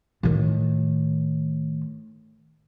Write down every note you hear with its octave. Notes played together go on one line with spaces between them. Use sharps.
A2 D#3